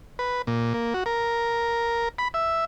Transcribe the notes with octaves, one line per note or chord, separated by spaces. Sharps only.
B4
A#2
A#3
F#4
A#4
B5
E5